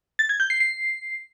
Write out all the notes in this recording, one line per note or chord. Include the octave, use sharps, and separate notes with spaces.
A6
G#6
G6
C7
C7